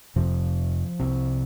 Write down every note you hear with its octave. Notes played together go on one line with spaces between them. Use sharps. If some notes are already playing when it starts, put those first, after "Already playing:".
F1 F2 C3 F3
C2 C3